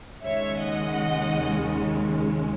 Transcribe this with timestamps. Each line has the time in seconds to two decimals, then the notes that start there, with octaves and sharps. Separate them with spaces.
0.23 D#2 C#3 G#3 C#4 C#5 E5
0.61 D#5 F#5